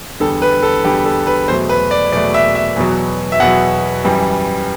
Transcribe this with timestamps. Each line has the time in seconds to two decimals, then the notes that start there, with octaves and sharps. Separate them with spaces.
0.20 E2 D3 G3 A4
0.42 B4
0.63 A4
0.84 E2 D3 G3 G4
1.05 A4
1.27 B4
1.48 E2 B2 F#3 A3 C5
1.69 B4
1.91 D5
2.12 E2 B2 F#3 A3 D5
2.34 E5
2.55 E5
2.76 E2 B2 F#3
3.32 E5
3.40 E2 B2 F#3 F#5
4.04 F#2 E3 G3